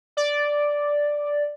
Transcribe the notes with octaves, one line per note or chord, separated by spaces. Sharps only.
D5